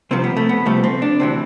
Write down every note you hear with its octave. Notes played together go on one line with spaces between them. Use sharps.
C2 C3 F3 C4
B3
A3
B3
C2 C3 F3 A3
C4
D4
D2 C3 E3 C4